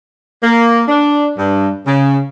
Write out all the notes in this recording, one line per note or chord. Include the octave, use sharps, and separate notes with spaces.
A#3
D4
G2
C#3